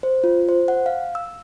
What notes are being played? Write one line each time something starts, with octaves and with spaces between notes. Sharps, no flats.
C5
F4
C5
F#5
F5
E6